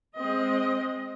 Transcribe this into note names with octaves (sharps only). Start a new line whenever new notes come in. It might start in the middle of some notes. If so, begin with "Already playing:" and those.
G#3 C4 D#5